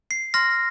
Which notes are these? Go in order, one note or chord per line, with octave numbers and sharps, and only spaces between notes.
C7
C6 F6 A#6